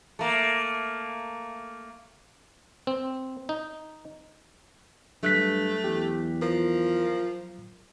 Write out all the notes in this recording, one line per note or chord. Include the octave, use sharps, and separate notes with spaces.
A3 A#3
C4
D#4
G2 F#3 A3 F#6 B6
E2 G4
F3 A#4